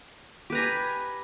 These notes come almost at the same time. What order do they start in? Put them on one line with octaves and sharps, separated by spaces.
G4 B4 A#5 G#5